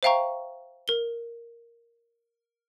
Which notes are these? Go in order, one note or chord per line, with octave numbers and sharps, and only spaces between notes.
C5 E5 F5 G5 A#5 C#6
A#4 G7